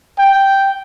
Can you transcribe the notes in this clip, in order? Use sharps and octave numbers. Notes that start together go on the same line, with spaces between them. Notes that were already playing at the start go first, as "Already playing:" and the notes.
G5